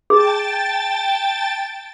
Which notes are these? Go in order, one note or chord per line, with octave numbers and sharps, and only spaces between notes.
G#4 G5 A5 A6